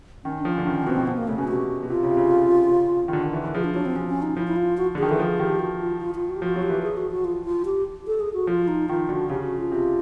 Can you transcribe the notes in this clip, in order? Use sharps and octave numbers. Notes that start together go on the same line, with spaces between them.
D#3 C#4
D4
F3
C#4
D3
D#3 C#4
D#3
B2 C4
B2
B3
A#3
C#3 A3
B2 C#4
C3 F#4
B2
C3 F4
C#3
C3
C#3
C#3
D#3
D3
D#3
E3
E3
F3 G#4
D4
F#3 D4
C4
F3 C#4
C#4
D#4
F3 E4
E4
F4
F#4
D3
G#4
D#3
E3 A4
F3 G#4
D#3 G4
F#4
F4
F4
F4
F#4
G4
F3 F#4
F#3
G4
E3
G#4
F#4
F#4
F4
F4
G4
A4
G#4
F#4
F3 F4
D#4
D#3 F4
D3 F#4
C#3 G4
F#4
F4
C3